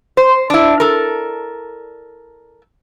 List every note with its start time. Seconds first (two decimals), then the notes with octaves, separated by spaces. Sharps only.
0.17 C5
0.50 D4 E4
0.80 A4 A#4